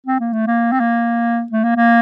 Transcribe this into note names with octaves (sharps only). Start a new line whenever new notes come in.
C4
A#3
A3
A#3
C4
A#3
A3
A#3
A#3